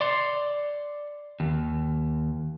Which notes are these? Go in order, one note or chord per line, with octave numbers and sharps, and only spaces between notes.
D5 C6
D#2